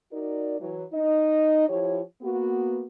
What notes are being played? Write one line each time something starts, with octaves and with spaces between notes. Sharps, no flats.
D#4 F#4 A#4 D5
E3 F#3
D#4 D#5
F3 E4 G4 C#5
A#3 B3 F#4